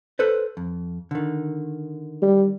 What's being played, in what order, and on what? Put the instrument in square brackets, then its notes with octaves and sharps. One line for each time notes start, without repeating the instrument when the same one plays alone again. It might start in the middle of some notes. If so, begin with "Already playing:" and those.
[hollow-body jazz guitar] A4 B4 C5
F2
D3 D#3
[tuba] G3